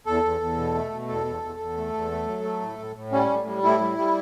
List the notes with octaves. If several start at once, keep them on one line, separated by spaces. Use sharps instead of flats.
E2 A4
E2
E2
B2
A3
B2
E2 A4
E2
E2
E2
A3
E2
A3
F#3
A3
A2
A2
A2
G3 C#4
A2
G3
A2 E4
G3
G3